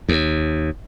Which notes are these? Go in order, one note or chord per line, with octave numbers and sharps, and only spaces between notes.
D#2